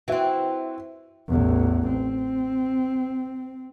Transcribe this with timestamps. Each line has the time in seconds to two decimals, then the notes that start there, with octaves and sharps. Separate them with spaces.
0.08 E3 C4 F#4 E5
1.29 A1 E2
1.88 C4